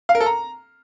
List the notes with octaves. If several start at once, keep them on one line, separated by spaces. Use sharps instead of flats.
F5
A#4
A4
A#5